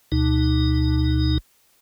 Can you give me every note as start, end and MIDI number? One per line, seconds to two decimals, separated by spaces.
0.12 1.38 38
0.12 1.38 47
0.12 1.38 63